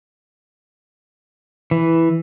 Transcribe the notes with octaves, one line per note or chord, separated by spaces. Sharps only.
E3